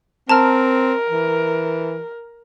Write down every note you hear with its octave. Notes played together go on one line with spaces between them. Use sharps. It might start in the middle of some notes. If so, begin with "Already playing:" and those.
C4 A#4 A5 A#5 F6
E3